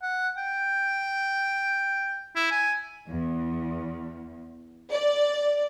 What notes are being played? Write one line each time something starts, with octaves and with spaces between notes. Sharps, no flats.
F#5
G5
E4
G#5
E2
D5